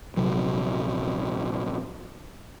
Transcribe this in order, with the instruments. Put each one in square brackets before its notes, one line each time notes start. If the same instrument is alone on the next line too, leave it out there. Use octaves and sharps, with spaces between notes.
[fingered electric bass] A#1 C3 F#3